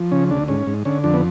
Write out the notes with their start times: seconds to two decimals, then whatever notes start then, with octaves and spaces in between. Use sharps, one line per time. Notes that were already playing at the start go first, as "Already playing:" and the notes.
Already playing: F3
0.11 C#3 C#4
0.30 D2 D4
0.48 G#2 C#4
0.67 G#2
0.85 D3 C#4
1.04 F2 D4
1.14 B3